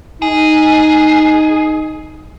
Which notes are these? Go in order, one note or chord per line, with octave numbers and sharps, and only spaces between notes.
D#4 G#4